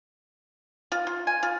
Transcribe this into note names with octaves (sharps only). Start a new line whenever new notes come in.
F4
F4
G#5
F4